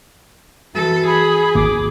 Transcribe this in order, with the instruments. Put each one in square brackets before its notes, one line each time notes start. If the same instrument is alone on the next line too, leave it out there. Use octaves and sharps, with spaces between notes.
[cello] E3 A4 [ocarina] F#4
[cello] G#4 [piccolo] B5
[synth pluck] G#1 D#2 [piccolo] D6